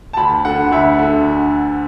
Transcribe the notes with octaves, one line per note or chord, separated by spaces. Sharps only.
A5
D2 B5
D3 F#5
D2 E5
D3